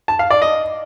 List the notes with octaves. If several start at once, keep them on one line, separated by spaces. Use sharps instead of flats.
A5
F5
D5
D#5